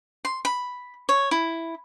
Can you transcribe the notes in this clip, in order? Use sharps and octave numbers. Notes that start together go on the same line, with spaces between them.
C6
B5
C#5
E4